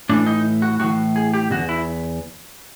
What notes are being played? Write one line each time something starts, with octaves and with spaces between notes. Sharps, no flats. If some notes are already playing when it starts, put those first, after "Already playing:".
A2 E3 D4
D#4
F#4
A2 E3 F#4
G#4
G4
E2 B2 F#4
E4